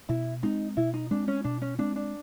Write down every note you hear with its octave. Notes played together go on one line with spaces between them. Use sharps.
B2 E4
G#3 C4 D#4
B2 E4
D#4
G#3 C4 D4
C#4
B2 D4
C#4
G#3 C4 D4
D4